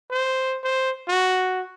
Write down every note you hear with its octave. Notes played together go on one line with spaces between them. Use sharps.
C5
C5
F#4